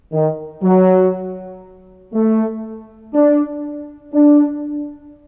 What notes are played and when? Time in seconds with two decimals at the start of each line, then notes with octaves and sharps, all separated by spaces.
0.13 D#3
0.63 F#3
2.13 A3
3.14 D4
4.14 D4